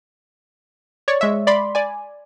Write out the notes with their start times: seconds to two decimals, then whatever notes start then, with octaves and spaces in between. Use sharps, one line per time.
1.08 C#5 D5 C#6
1.21 G#3 E5
1.47 D5 B5 C6
1.75 D5 G#5